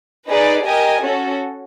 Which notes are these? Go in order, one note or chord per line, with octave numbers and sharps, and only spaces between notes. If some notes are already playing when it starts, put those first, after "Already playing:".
D#4 G#4 B4 D5
G4 A#4 D#5 G#5
C#4 F#4 A4